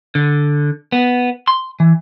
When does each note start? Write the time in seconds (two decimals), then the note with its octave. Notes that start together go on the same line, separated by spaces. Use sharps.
0.15 D3
0.92 B3
1.48 C6
1.80 E3